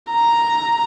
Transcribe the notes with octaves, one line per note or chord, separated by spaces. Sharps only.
A#5